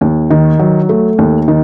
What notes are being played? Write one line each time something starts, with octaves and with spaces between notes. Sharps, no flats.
D#2
D#3
F#3
A3
D#2
D#3